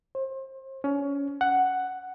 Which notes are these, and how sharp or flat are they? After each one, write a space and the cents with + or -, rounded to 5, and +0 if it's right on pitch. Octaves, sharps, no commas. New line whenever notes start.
C5 +30
C#4 +25
F#5 +5